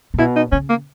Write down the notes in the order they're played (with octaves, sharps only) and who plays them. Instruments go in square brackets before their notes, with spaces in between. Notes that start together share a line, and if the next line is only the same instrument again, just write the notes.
[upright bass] A#2
[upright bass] B2 [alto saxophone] E4
[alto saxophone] D#4
[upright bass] C#3 [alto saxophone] C#4
[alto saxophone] A#3